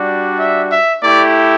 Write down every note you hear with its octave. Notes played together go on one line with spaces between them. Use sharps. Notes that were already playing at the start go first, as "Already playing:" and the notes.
Already playing: G3 D4 F#4
E5
E5
A3 E4 G4 D5